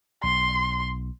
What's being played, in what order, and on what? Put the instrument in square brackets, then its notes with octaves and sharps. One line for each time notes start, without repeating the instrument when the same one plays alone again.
[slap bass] B1 [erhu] C6